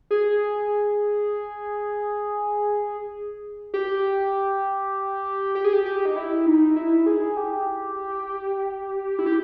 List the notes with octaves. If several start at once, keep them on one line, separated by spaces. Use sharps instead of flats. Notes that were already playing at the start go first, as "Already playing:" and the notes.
G#4
G4
G4
G#4
G4
G4
D#4
E4
D#4
E4
G#4
G4
E4
G4